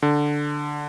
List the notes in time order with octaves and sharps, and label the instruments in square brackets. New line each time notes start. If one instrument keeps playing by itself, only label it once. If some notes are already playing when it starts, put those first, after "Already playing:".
[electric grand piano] D3